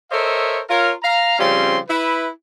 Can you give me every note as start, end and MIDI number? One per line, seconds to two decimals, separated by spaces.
0.11 0.60 69
0.11 0.60 70
0.11 0.60 72
0.11 0.60 73
0.11 0.60 75
0.11 0.60 76
0.69 0.92 65
0.69 0.92 70
0.69 0.92 73
1.03 1.38 77
1.03 1.38 82
1.39 1.78 49
1.39 1.78 53
1.39 1.78 55
1.39 1.78 60
1.39 1.78 61
1.39 1.78 84
1.89 2.28 64
1.89 2.28 71